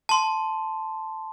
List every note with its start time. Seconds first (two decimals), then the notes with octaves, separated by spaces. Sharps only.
0.09 A5 C6